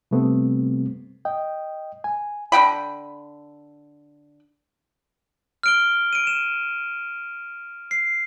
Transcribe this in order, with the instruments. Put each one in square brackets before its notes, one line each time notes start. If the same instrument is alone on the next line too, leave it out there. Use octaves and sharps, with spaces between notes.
[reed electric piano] C3 G3 A3 B3 C4
D#5 G5
G#5
[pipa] D3 F#5 G5 B5
[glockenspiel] F6 D7 G7
D7 D#7
E7
C7